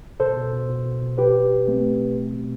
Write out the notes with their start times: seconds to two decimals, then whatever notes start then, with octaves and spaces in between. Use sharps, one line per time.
0.20 B2 A4 C5
0.36 B2
0.53 B2
0.69 B2
0.85 B2
1.01 B2
1.18 B2 G4 B4
1.34 B2
1.50 B2
1.67 B2 A3 C4
1.83 B2
2.00 B2
2.16 B2
2.33 B2